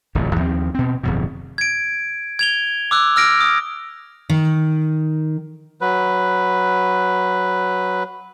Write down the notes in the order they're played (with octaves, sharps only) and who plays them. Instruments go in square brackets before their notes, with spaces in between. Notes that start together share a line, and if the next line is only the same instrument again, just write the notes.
[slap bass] D1 A1 F2 A#2
D#2 F3 C4
B2 C4
D1 F2 B2
[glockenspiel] G#6 D7
G#6 F7 G7
D6 E6 F#6
E6 F6 A#6 D7
D#6
[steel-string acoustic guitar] D#3
[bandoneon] F#3 B4